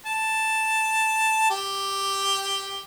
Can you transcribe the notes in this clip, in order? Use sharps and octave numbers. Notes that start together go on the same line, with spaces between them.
A5
G4